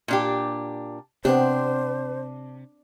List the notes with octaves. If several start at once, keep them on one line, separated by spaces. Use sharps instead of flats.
A#2 D4 G4
C3 B3 C4 D4 G4 C5